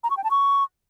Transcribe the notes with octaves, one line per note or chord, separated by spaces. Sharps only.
A#5
C#6
G5
A5
C#6